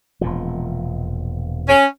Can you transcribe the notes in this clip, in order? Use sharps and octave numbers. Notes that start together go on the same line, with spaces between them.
E1 A#2 F3
C#4